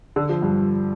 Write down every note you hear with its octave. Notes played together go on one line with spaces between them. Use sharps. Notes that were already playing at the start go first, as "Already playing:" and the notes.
D3
F3
G2